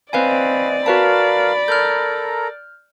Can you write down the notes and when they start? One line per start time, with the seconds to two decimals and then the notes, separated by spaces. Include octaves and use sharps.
0.13 C4 B4 D5 D#5 F5 G#5 B5
0.86 F#4 A#4 B4 F5 A5 B5
1.68 A4 A#4 A#5 F6 G6